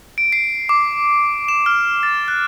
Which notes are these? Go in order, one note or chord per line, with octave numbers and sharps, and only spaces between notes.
D7
C7
D6
E7
F6
A6
F#6